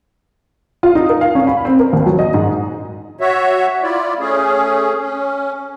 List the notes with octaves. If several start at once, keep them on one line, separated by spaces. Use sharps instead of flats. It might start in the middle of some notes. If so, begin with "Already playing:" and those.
F4
D#4
A#4
F5
C#4
B5
C4
A#4
D#2
F#3
D#5
G#2
F#4 C#5 E5
E4 F4 D5
A3 C#4 G#4
C#4